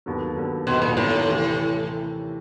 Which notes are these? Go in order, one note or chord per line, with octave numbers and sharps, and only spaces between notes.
D#2 D3 F#3 B3
D#2 D3 F#3 B3
D#2 B2 D3 F#3 B3
A#2
D#2 A2 D3 F#3 B3
C3 E3 A3